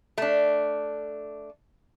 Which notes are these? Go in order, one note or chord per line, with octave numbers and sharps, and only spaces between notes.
A3 D4